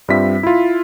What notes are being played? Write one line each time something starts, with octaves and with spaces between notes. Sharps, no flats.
G2 G3 C4 F4 E5 B6
E4 F4